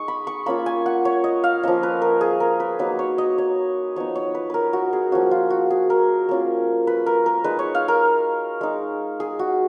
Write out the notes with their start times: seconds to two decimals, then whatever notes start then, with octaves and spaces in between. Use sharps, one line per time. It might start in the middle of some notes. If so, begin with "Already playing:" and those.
Already playing: G#3 D#4 C#6 D#6
0.08 B5
0.27 C#6
0.46 A#3 C#4 F4 B5
0.66 G#5
0.86 F#5
1.05 C#5
1.24 D#5
1.44 F5
1.63 F3 A#3 C#4 D#5
1.83 B4
2.02 A#4
2.21 G#4
2.40 A#4
2.60 B4
2.79 F#3 A#3 D#4 B4
2.99 C#5
3.18 D#5
3.38 C#5
3.96 F3 B3 D#4 C#5
4.15 C#5
4.35 B4
4.50 A#4 B4
4.73 F#4
4.93 G#4
5.12 F3 A#3 C#4 F#4
5.31 F4
5.50 F#4
5.70 G#4
5.90 A#4
6.29 A#3 C#4 F4
6.87 B4
7.06 A#4
7.26 A#4
7.44 G#3 D#4 B4
7.59 C#5
7.75 F5
7.88 A#4
8.61 G#3 D#4
9.20 G#4
9.39 F#4